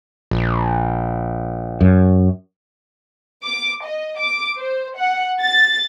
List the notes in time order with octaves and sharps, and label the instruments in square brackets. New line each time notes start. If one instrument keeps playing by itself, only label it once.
[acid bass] A#1
[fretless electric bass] F#2
[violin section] D6
D#5
D6
C5
F#5
A6